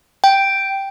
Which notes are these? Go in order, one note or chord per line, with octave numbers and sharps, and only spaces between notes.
G5